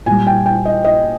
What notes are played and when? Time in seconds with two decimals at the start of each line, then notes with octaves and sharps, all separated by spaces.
0.06 A#2 G3 G#5
0.27 G5
0.46 G5
0.65 D#5
0.85 D#5